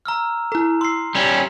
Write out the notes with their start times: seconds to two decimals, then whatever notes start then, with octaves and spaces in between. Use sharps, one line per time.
0.06 A#5 E6 F6
0.52 E4 A4 A#5
0.81 C6 E6 C7
1.15 G3 C#4